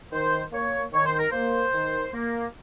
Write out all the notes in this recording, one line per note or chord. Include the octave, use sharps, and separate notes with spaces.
D#3 C5
A#3 C#5
D#3 C#5
C5
A#4
A#3 C5
D#3
A#3